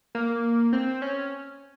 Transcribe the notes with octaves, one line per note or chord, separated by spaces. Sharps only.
A#3
C4
C#4